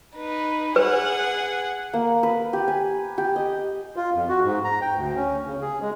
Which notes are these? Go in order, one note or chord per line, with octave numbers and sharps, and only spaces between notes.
D#4 B4
G#4 B4 F#5
A#3
B4
G4
G#5
G4
D#5
F4
F2
F#4
G#2
A#5
G5
D2
C#4
C#3
G#4
G#3